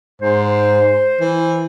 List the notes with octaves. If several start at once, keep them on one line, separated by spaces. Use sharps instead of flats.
G#2 C5
E3